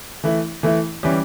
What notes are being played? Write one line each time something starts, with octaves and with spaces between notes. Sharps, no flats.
E3 A3 E4
E3 A3 E4
E3 G3 C#4 G4